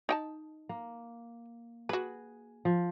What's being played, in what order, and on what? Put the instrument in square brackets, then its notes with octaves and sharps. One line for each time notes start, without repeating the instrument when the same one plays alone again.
[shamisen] D#4 G5 A5
[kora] A#3
[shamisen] F#4 B4 [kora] G#4
[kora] F3